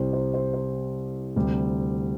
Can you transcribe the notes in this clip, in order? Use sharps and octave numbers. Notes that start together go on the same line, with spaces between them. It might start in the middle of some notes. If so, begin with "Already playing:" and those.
Already playing: C2 C3 G3 C5
C5
C5
C5
D2 C3 G3